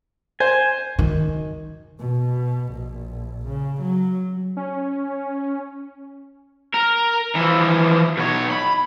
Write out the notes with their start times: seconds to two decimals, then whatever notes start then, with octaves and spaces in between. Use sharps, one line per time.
0.40 C5 G#5
0.99 F#2 D#3
2.00 B2
2.73 A#1
3.47 C#3
3.82 F#3
4.57 C#4
6.74 A#4
7.35 E3 F3
8.17 B2 C#5
8.51 B5